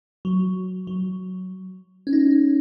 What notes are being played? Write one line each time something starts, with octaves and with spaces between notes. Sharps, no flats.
F#3
F#3
C#4
D#4